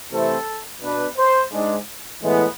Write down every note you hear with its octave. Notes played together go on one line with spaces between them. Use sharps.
C3 E3 A3 C4 E4 A4
B2 B3 D4 B4
C5
G#2 G#3 D4
A2 E3 G#3 B3 E4